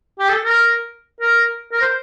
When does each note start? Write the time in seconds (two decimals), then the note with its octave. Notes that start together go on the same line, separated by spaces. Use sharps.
0.19 G4
0.29 A4
0.45 A#4
1.21 A#4
1.72 A#4
1.81 C5